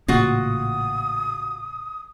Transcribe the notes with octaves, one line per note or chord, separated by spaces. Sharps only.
A1 A#2 C#3 F4 F#4 F#5 D#6